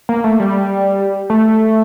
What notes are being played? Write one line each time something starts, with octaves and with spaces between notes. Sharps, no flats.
A#3
A3
G3
A3